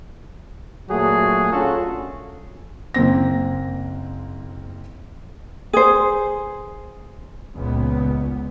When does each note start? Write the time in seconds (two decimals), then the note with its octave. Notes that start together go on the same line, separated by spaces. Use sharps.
0.89 A#2 F#3 A3 F#4 G#4
1.51 C#4 D4 F4 F#4 A4
2.94 F#1 A#3 C4 A#6
5.73 G#4 C5
7.54 C#2 A#2 B3